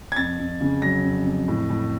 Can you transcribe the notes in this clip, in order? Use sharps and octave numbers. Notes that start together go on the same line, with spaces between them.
G#6
F2 A6
F2
C#3
F#3 A#6
F2
F2
A2
A2